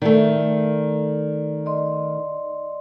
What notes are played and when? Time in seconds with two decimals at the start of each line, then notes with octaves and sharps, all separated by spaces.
0.02 D#3 A3 D5
1.66 D5 D#5 C6